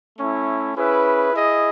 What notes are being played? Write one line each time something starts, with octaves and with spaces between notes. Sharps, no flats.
A3 C#4 E4
C#4 E4 G#4 B4 E5
E4 G#4 D#5